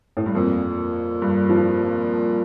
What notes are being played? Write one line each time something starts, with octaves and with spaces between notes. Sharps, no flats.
A2
G2
F2 A#2
G2
F3